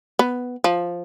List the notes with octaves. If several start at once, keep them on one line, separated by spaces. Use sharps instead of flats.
B3
F3